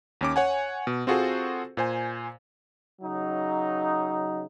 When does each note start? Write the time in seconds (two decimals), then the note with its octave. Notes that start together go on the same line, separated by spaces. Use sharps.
0.21 D#2 C#4 D6
0.36 C#5 F#5 G#5
0.87 B2
1.07 C4 F4 F#4 G#4 A4 C5
1.77 A#2 C5 G#5
3.02 C#3 F#3 D#4